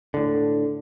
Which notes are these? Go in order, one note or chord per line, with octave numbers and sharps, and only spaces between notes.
A2 D3